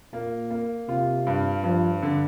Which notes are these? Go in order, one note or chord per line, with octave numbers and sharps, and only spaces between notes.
A#2 A#3
A#3
C3 F4
G2
G2 F3
D3